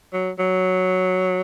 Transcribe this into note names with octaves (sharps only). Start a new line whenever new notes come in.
F#3
F#3